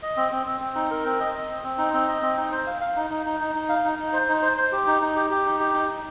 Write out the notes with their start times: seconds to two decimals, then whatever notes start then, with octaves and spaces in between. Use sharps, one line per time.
0.03 D#5
0.17 C4
0.32 C4
0.47 C4
0.61 C4
0.75 D#4
0.91 A#4
1.05 C4
1.20 D#5
1.34 D#5
1.49 C4
1.64 C4
1.78 D#4
1.94 C4
2.08 D#5
2.22 C4
2.37 D#4
2.52 C5
2.67 F5
2.81 F5
2.97 D#4
3.10 D#4
3.26 D#4
3.40 D#4
3.55 D#4
3.69 F5
3.84 D#4
3.99 D#4
4.13 C5
4.29 D#4
4.42 C5
4.57 C5
4.72 G4
4.87 D#4
5.02 D#4
5.16 G4
5.30 G4
5.46 D#4
5.60 G4
5.74 D#4
5.90 D#4